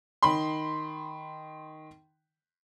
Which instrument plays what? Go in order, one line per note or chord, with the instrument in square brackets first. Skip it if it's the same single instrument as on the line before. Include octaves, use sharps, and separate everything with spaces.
[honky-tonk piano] D#3 B5 C6